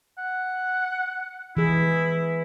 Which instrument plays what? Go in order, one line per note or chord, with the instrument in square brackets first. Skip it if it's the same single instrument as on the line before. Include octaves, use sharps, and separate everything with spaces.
[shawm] F#5
[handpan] E3 G#4 [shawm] E4